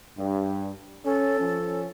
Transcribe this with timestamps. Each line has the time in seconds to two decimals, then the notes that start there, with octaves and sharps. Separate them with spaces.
0.18 G2
1.05 C#4 A4
1.39 F3 C#4